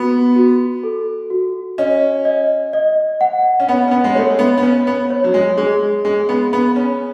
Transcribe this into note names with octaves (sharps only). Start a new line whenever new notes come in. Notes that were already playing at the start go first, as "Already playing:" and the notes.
Already playing: B3 F#4
F#4
A4
F#4
C#4 D#5
D#5
D#5
F#5
C#4
B3 F#5
C#4
B3
G#3
A3 C#5
B3
B3
C#4 C#5
B3
C#5
F#3
G#3
G#3 G#4
G#3 G#4
B3
B3 B5
C#4